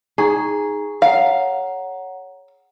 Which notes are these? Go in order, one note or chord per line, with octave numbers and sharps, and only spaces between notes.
D#4 G#4 A#5 C#6
C#5 F5 F#5 A#5